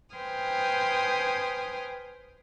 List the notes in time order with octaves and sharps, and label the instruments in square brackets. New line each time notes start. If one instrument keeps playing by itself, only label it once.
[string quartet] B4 C5 G5 G#5 D#6 F6